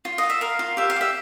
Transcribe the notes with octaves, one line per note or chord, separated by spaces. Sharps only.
F4
D#5
F4
E5
A#4 F5
F4
G4 E5
F5
G4 E5